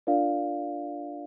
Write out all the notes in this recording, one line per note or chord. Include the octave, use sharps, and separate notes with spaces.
D4 F4 A#4 D5 F5